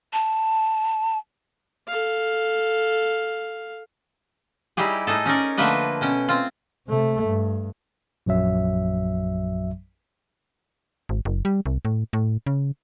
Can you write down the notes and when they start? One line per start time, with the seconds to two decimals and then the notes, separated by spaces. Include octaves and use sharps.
0.13 A5
1.88 A4 F5
4.77 G3 D#4 E4 G4 G#4
5.07 A2 D#4 G#4 A4
5.26 C#4 D#4 A#4 D5
5.57 D3 F3 A3 A#3 B4 D#5
6.01 B2 C#4 G5
6.29 C4 F4
6.87 C3 A3
7.23 G2
8.26 A#1 F#2 F#3 E5
11.09 G#1
11.25 F#1
11.45 G3
11.66 C2
11.85 A2
12.13 A2
12.46 C#3